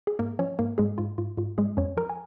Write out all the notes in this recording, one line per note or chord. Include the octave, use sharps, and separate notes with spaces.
G#4
G#2 A#3 A#4
F3 C#4 C#5
G#2 A#3 A#4
G#2 G#3 G#4
G#2 F4
G#2 F4
G#2 F4
G#2 G#3 G#4
F2 C#4 C#5
F3 A#4 A#5
G#5